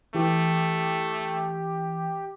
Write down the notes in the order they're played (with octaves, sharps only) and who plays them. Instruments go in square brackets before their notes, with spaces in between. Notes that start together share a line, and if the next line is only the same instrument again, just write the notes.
[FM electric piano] E3 [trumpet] A3 [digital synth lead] G4